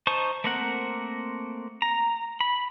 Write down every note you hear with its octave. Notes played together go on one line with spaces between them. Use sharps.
D#4 C5 A5 C#6
A3 A#3 C4 A#4 F#5
A#5
B5